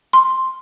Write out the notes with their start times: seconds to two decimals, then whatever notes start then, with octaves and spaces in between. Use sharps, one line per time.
0.13 C6